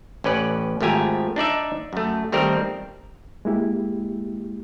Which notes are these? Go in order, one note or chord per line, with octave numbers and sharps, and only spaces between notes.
A1 C#4 B4 D5
G#1 F3 A3 G4 G#5 A#5
D4 D#4 D5 E5
F#2 A3
D#3 G3 A3 C4 A#4 D5
G#3 A#3 E4 G4